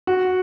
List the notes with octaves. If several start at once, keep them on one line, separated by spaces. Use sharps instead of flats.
F#4